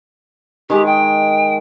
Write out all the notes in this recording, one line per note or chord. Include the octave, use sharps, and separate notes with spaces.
D#3 G#3 G4
G5